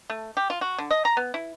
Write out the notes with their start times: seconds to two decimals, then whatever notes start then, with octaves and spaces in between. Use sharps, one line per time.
0.10 A3
0.37 G4
0.50 F4
0.61 F#4
0.78 D3
0.91 D#5
1.05 A#5
1.17 B3
1.34 E4